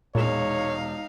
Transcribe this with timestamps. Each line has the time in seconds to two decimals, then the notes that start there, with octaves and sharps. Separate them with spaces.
0.15 E1 A#2 G#3 D#4 C#5 F5 E7